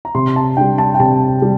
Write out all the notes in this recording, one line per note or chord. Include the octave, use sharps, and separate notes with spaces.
A#5
C3 C6
A5
G3 D4 G5
A5
G5
C3 A5
G3